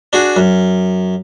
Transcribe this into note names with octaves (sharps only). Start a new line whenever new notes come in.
D4 F#4 G#4
F#2